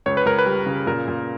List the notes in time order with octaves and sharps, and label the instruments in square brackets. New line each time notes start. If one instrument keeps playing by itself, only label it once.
[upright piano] C#2 [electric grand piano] C#5
[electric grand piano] B4
[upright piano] C#2 [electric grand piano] A#4
[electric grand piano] B4
[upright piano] G3
C#3
[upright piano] A#2 [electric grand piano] A#4
[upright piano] A#2